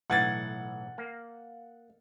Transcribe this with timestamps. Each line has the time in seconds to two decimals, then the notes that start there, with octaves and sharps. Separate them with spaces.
0.10 B1 A2 E3 F#5 G#6 A6
0.98 A#3